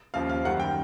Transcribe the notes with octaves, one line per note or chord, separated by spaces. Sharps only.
D#2 C#3 F3 F5
F5
F#2 D#3 G3 F#5
G5